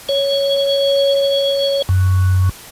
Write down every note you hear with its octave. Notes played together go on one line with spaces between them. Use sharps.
C#5
F#2